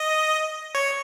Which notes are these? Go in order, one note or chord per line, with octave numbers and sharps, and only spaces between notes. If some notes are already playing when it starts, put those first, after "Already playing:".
Already playing: D#5
C#5